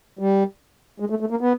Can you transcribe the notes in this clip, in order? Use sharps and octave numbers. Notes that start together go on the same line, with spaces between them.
G3
G#3
A3
A3
A#3
B3